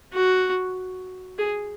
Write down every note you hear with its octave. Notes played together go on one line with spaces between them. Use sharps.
F#4
G#4